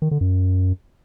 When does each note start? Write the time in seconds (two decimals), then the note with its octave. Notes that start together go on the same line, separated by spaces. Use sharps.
0.02 D#3
0.11 D3
0.21 F#2